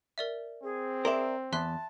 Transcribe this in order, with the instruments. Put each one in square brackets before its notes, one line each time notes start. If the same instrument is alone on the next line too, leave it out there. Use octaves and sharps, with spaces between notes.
[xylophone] A#4 D5 E5
[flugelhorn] C4 [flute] G#4
[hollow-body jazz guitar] A#4 D5 E5 [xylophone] C6
[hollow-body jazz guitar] E2 [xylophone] E5 C6 F#6 [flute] A5